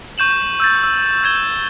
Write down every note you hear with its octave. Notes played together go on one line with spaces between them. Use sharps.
C#6 G6 E7 F#7
E6 G6 A6
E6
G6 G#6 E7 G7